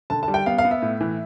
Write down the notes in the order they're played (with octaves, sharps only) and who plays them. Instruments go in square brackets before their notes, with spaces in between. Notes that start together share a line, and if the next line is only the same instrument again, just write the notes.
[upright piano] D3 A5
A5
G3
G5
B3 F5
F5
B3
E5
A2
E3